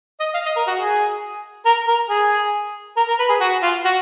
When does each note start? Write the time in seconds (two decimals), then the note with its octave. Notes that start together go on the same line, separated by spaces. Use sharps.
0.20 D#5
0.34 F5
0.46 D#5
0.56 A#4
0.67 F#4
0.78 G#4
1.66 A#4
1.87 A#4
2.10 G#4
2.97 A#4
3.08 A#4
3.19 B4
3.30 G#4
3.41 F#4
3.63 F4
3.85 F#4